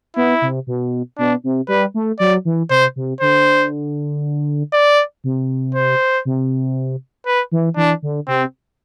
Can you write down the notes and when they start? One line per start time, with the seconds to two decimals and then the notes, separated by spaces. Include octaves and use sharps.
0.16 B3 E4
0.42 C3
0.67 B2
1.18 B2 D4
1.44 C3
1.68 G3 B4
1.94 A3
2.19 F#3 D5
2.45 E3
2.70 C3 C5
2.96 C3
3.21 D3 C5
4.73 D5
5.24 C3
5.74 C5
6.25 C3
7.26 B4
7.52 E3
7.76 E3 D4
8.02 D3
8.28 C3 C4